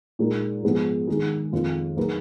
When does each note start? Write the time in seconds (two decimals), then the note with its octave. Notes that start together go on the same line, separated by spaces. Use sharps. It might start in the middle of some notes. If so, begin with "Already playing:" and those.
0.19 A#2 G#3 D#4 A#4
0.63 G#2 F3 G#3 B3
1.07 D#3 G#3 D#4 G#4
1.53 F2 D#3 A#3 F4
1.97 F#3 A#3 D#4 G#4 B4